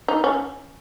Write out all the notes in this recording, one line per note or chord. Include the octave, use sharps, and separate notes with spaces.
D#4
C#4